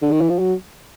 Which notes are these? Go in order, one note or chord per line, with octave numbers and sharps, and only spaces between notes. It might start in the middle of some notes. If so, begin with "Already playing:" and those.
D3
D#3
E3
F3
F#3